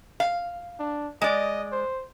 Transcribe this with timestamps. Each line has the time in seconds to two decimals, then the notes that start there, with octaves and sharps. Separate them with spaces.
0.20 F5
0.80 D4
1.22 G#3 D5 D#5
1.72 C5